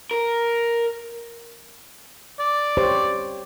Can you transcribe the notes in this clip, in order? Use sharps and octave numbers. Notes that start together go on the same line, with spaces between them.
A#4
D5
G4 C5 C#5